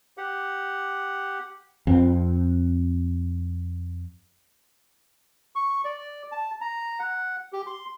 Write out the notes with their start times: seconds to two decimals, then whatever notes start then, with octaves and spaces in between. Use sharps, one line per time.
0.18 G4 F#5
1.87 F2 C4
5.55 C#6
5.85 D5
6.32 A5
6.61 A#5
6.99 F#5
7.53 G4
7.67 C6